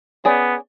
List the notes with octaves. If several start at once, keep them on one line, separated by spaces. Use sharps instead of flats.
B3 C#4 G#4 D5